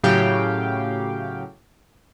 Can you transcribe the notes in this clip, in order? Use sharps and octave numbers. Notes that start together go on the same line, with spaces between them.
A2 C#3 F#3 G4 F5 G5